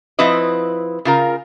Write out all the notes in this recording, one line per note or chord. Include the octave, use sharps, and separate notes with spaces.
F3 C4 E4 B4 D#5
C#3 F4 A#4